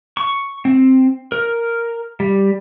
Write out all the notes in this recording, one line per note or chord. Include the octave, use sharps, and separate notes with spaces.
C#6
C4
A#4
G3